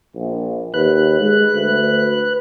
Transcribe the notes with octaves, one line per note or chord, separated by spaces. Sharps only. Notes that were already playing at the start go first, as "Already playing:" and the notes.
A#1
D#2 B4 F#6
G#3
D2